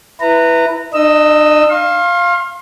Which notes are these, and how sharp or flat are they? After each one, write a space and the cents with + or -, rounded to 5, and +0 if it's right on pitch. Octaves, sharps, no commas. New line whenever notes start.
E4 +0 B4 +0 A#5 -25
D4 +45 D#5 +0 E6 +5
F5 +0 C6 +40